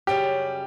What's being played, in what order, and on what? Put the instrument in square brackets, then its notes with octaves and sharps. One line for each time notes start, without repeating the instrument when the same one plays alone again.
[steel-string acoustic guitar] F#2 C#3 G3 C#4 [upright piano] G4